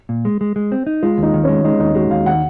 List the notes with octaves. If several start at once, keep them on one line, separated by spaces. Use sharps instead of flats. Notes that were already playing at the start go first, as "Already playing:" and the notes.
A#2
G#3
G#3
G#3
C4
D#4
G#3 F4
D#2 D#4
D#3
G#3 C#4
G#3 D#4
D#2 D#4
G#3 F#4
D#2 F5
D#3 F#5